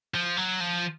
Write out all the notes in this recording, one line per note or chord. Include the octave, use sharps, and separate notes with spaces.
F3
F#3
F3